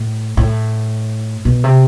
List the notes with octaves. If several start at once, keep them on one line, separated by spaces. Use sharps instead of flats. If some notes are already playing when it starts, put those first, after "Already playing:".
Already playing: A2
A2
B2
C3